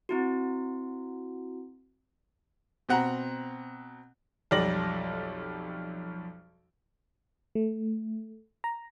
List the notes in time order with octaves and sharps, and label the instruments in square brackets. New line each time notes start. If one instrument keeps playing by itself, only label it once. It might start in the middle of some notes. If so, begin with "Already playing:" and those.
[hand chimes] C4 E4 F#4
[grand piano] B2 C4 F#5 A#5
B1 F2 G3 D5 A#6 F#7
[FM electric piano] A3
A#5